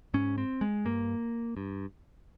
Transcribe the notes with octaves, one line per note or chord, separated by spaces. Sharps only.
G#2 C#4
C4
G#3
G2 A#3
G2